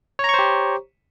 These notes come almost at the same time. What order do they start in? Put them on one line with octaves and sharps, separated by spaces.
C#5 A#5 C#6 C5 G4